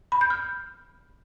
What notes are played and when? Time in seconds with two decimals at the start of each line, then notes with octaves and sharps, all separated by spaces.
0.12 B5
0.21 G6
0.30 F6